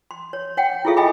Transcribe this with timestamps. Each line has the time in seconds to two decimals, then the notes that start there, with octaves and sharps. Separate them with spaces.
0.11 C6
0.33 C#5
0.57 C#5 F#5 G5
0.85 E4 F4 G#4 A4 E5 F5
0.97 D#5 E5 G5 G#5 B5 D6